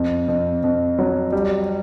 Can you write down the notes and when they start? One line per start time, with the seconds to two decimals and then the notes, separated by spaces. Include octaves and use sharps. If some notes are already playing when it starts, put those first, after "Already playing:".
Already playing: F2
0.28 F2
0.63 F2
0.99 F#3
1.33 G3